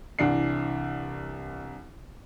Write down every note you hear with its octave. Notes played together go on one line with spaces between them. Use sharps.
C2 E3 D4 C7